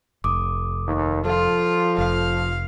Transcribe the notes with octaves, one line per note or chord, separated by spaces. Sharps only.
F1 D6 D#6
D#2
F3 F4 A4
F1 F5